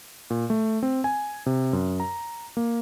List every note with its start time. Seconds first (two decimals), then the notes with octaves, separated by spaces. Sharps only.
0.30 A#2
0.50 A3
0.83 C4
1.04 G#5
1.46 C3
1.73 F#2
2.00 A#5
2.57 A#3